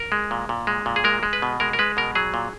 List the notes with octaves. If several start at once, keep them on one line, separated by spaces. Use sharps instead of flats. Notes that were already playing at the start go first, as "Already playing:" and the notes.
Already playing: A#4
G#3
A#2
A#2
G#3
A#2
G#4
G#3 A#4
G#3
B4
B2
G#3 A#4
A#4
G#3 B4
B2 A#4
F#3 G#4
A#2